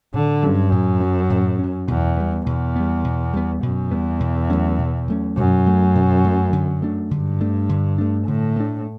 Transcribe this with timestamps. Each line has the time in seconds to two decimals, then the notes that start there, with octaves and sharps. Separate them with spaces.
0.14 A2 D3
0.43 G2 F#3 C#4
0.72 F#2 A2
1.01 F#3 C#4
1.30 A2
1.59 F#3 C#4
1.88 E2 B2
2.17 G3 B3
2.46 E2 B2
2.76 G3 B3
3.04 B2
3.34 G3 B3
3.63 F#2 B2
3.91 E2 G3 B3
4.20 B2
4.50 F#3 A3 C#4
4.78 B2
5.08 F#3 A3 C#4
5.37 F#2 B2
5.66 F#3 A3 C#4
5.95 B2
6.24 F#3 A3 C#4
6.53 D3
6.82 A3 D4
7.11 G2 D3
7.41 A3 D4
7.69 D3
7.98 A3 D4
8.28 A2 D3
8.56 A3 D4